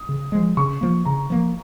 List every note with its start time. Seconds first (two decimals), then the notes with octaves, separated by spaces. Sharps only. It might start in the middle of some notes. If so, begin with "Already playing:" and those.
Already playing: D#6
0.09 C#3
0.32 F3 G#3
0.57 C#3 C#6
0.81 F3 A#3
1.05 C#3 A#5
1.30 F3 A#3